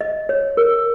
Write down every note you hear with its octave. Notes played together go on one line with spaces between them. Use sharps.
D#5
C#5
A#4